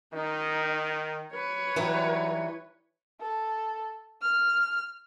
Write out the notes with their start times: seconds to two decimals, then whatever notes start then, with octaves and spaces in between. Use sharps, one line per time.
0.13 D#3 D#4
1.32 B4 C#5
1.76 E3 F#3 G3 D#4
3.20 A4
4.22 F6